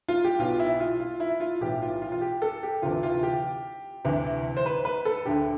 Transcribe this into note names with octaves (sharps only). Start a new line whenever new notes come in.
F4
G4
B1 B2 F4
E4
F4
F4
E4
F4
B1 A2 E3 G4
F4
F4
F4
G4
A4
G4
D2 C3 E3 F4
F4
G4
D2 C3 E3
C5
B4
B4
A4
D2 D3 G4